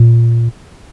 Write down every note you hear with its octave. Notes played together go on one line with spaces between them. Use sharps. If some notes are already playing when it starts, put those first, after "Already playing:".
Already playing: A#2